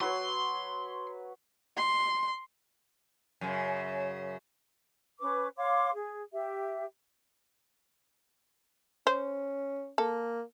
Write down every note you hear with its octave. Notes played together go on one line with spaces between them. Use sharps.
F#3 B4 C#5 C6
C6
F#2 C#3
C#4 B4 C#6 D6
C#5 F5 C6 D6
G#4
G4 E5
C#4 C5
A#3 A4